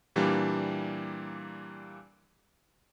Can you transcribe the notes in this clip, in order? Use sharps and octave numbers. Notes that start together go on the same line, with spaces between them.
A#2 E3 G3 A#3 D4 G4